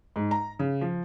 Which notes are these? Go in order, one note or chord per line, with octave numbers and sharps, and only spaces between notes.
G#2
A#5
C#3
F3